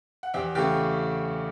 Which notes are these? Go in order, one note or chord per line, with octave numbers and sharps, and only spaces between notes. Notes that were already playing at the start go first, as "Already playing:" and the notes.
F#5
E2 G4 G5
C#3 E3 A3 G4 G5